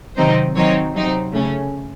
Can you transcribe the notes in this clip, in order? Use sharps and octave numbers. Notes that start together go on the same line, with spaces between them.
C3 D#3 F#3 C4 D#4 C5
D#3 F#3 C4 D#4 C#5
C3 F#3 C4 D#4
C#3 A3 C#4